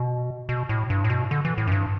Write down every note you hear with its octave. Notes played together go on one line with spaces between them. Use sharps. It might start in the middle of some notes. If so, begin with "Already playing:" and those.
Already playing: B2
B2
A2
G2
A2
B2
D3
E3
A2
F#2
G2